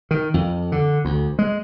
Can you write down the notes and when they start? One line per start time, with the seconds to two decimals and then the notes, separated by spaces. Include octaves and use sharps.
0.11 D#3
0.34 F2
0.72 D3
1.05 D2
1.39 G#3